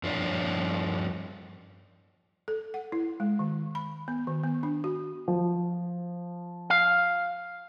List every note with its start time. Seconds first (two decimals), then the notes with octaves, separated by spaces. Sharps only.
0.03 G2 F3 D4 F4 C#5 D5
2.48 A4
2.74 F#5
2.92 E4
3.20 G#3
3.39 D#3
3.75 B5
4.08 B3
4.27 D#3
4.43 B3
4.63 D4
4.84 F#4
5.28 F3
6.70 F5